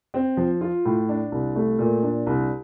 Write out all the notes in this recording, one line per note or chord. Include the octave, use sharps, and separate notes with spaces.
C4
F3
F4
A2
D4
C2
A3
A#2
D4
C2